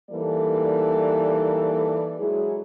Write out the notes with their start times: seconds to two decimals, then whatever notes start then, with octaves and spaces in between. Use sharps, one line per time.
0.11 E3 G3 A#3 D#4 A4 D5
2.19 F#3 G#3 E4 G#4